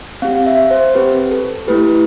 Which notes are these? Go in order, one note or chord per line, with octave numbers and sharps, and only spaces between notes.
C4 G4 F5
E5
C5
C4 G4 B4
A4
A3 E4 G4 B4